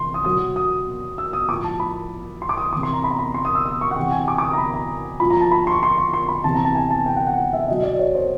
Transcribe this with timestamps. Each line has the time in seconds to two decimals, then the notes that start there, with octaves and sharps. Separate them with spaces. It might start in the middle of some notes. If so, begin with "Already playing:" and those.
Already playing: C3 E3 C6
0.14 D#6
0.25 B2 F#3 D#6
0.56 D#6
1.18 E6
1.33 D#6
1.48 A2 F3 D6
1.64 A5
1.80 B5
2.42 C6
2.49 D6
2.58 D#6
2.73 C3 E3 D6
2.83 C6
2.93 A#5
3.04 B5
3.11 A#5
3.19 B5
3.34 C6
3.45 D#6
3.55 E6
3.66 D#6
3.81 C#6
3.91 F#5
3.96 C3 E3 G5
4.12 G#5
4.28 D6
4.38 D6
4.43 D#6
4.53 A#5
4.58 B5
4.74 A#5
5.20 A#2 F3 B5
5.30 A#5
5.41 A5
5.52 B5
5.67 C6
5.72 C#6
5.83 C6
5.98 C#6
6.13 C6
6.29 B5
6.44 C3 E3 A5
6.55 A#5
6.65 A5
6.75 G#5
6.91 A5
7.06 G5
7.16 F#5
7.27 F#5
7.53 E5
7.68 B2 F#3 D#5
7.83 D5
7.99 C#5
8.15 C5